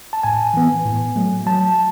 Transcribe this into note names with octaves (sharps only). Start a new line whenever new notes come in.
A5
A2 G#5
E3 B3
A2
F#3 A3
F#3 A5